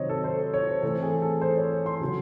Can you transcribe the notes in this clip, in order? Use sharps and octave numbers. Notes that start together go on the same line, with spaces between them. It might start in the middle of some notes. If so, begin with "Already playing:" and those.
Already playing: C3 D#3 F#3 C4 C#5 D#5
A4
C5
C#5
C5
E3 A3 C4 A4
G#4
A4
C5
C#5
C#5
C6
C#3 F#3 C#4